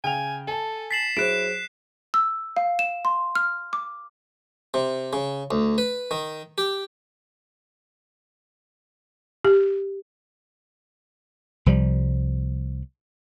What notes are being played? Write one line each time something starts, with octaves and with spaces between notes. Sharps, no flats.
C#3 G5 G#5 F7
A4 G#5 A5
A6 B6 C7 E7 F#7
F#3 E4 G#4 C5 F#6 D7 E7
E6
F5
E7
C6
F6
D6
C3
C#3
D2
B4
D#3
G4
G4
C2 F3 G3